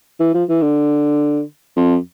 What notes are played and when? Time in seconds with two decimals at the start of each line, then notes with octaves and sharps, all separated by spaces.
0.20 E3
0.34 F3
0.49 E3
0.62 D3
1.76 F2